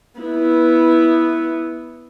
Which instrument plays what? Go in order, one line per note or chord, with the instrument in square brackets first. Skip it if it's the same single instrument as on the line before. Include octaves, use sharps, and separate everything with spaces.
[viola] B3 E4